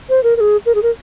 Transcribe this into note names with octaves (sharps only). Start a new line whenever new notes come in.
C5
A#4
A#4
G#4
A#4
G#4
A#4